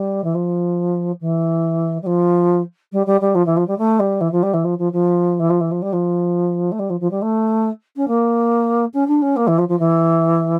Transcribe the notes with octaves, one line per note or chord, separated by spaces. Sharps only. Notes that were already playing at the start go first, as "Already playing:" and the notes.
Already playing: G3
E3
F3
E3
G3
F3
G3
G3
G3
F3
E3
F3
G3
A3
G3
E3
F3
G3
E3
F3
F3
F3
E3
F3
E3
F3
G3
F3
A3
G3
F3
F3
G3
A3
C#4
A#3
C#4
D4
C#4
A#3
E3
F3
F3
E3